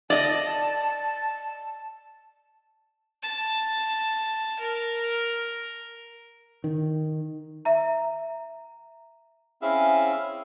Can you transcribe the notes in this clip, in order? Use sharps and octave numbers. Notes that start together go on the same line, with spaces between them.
D5 D#5 A5
A5
A#4
D#3
E5 A#5
C4 C#4 E4 G#4 E5 F5